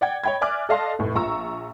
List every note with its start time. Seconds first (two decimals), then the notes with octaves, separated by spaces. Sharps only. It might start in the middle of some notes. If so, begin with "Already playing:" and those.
0.01 D5 F#5 G5 G#6
0.24 C#5 D#5 G5 B5 G#6
0.41 D5 E5 G#5 D6 F6 F#6
0.69 A4 D5 D#5 F5 A5 C6
0.99 F1 A2
1.15 A#1 F4 A#5 C#6 E6